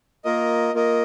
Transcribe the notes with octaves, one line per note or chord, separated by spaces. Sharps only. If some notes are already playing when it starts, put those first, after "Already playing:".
A#3 F4 A#4 D#5
A#3 F4 A#4 D#5